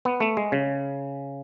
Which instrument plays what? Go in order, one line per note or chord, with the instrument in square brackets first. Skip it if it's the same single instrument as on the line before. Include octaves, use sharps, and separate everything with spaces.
[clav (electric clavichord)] B3
A3
G#3
C#3